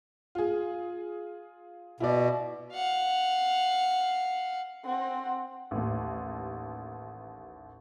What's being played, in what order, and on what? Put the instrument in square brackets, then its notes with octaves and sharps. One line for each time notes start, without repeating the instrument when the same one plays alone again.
[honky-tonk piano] F4 G#4
[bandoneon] B2 [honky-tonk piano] E4 D5
[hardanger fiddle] F5 F#5
[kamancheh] C4 F#5
[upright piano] A1 D#2